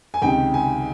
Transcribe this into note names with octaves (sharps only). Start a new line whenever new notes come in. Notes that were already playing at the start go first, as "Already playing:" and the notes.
G#5
C#2 C3 D#3 G5
G#5